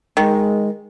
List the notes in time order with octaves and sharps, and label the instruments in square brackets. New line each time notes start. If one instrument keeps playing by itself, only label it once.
[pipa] D#3 [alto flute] G#3